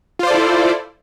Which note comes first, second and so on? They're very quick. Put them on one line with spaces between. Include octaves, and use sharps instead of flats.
F4 C5 D5 A4 E4